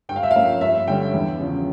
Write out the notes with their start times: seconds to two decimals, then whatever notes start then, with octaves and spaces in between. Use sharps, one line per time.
0.09 G2 G5
0.16 F5
0.23 E5
0.31 F3 A#3 C#4 F5
0.61 G2 E5
0.87 D3 G3 C#4 G5
1.14 E2
1.39 C#3 F3 C#4